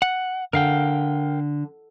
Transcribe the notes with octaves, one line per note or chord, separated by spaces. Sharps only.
F#5
D3 A#4 F5 G5